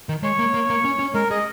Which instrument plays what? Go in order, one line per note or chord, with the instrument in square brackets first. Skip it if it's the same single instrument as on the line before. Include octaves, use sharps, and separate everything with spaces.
[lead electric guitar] D#3
[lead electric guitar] G#3 [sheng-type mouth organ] C#5
[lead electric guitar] A#3
A#3
A#3
C#4
C#4
[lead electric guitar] G#3 [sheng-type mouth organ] A#4
[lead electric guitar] G#4 [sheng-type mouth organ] D#5